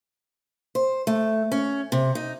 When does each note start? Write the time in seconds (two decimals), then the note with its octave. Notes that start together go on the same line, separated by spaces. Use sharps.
0.75 C5
1.07 A3
1.52 C#4
1.92 C3
2.15 D#4